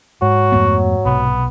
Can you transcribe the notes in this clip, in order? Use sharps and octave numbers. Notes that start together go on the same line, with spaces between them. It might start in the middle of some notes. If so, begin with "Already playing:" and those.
G#2 F#3 F#4
F2 A3 B3
B1 C3 B3